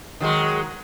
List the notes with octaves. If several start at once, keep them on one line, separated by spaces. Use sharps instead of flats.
D#3 F#3 G#3